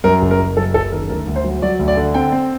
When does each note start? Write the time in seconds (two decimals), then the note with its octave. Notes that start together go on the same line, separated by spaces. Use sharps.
0.04 F#2 A#4
0.22 F#1
0.31 A#4
0.39 F#1
0.57 F#2 A4
0.74 F#1 A4
0.92 D#3 A#4
1.09 D2 A#4
1.27 D2
1.36 C5
1.44 F#3
1.62 F#3 D5
1.79 D2
1.88 D5
1.97 D3
2.14 C4 G5
2.32 C4